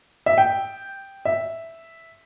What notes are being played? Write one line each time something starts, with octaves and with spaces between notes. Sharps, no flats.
E5
G5
E5